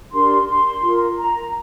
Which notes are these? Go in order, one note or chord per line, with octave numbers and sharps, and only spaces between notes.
D4 G4 A#4 C6
C6
F4 A#4
A#5